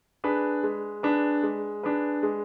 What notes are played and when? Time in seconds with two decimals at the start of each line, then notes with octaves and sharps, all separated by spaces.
0.24 D4 G#4 B4
0.63 G#3
1.03 D4 G#4 B4
1.43 G#3
1.83 D4 G#4 B4
2.23 G#3